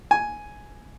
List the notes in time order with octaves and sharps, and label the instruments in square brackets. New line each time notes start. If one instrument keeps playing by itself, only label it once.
[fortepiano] G#5